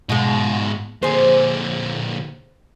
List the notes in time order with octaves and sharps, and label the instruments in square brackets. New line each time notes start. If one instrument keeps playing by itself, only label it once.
[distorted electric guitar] G#2 F4 [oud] B2 G#3
[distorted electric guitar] A#2 D3 [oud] G#4 C5